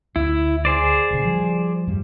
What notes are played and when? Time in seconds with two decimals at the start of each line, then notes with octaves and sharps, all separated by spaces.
0.16 D2 E4
0.65 G#4 C5 D5
1.10 D#1 C#3
1.25 F3 G3
1.87 E2 G2 G3